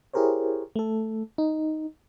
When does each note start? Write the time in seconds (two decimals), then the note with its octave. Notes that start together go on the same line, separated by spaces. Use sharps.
0.14 E4 G4 G#4 A#4 C5 C#5
0.76 A3 A4
1.38 D#4